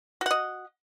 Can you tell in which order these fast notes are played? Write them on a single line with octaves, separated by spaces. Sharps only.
F#4 F#5 D#5